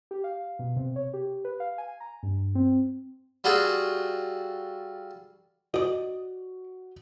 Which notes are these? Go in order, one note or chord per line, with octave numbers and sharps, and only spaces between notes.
G4
F5
B2
C3
C#5
G4
B4
F5
G#5
A#5
G2
C4
G3 F4 F#4 G#4 A4
F#4 D5 D#5